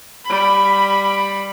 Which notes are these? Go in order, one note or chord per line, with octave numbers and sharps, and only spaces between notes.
G3 B5